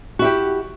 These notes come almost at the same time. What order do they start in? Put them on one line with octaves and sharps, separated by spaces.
F#4 E4 G4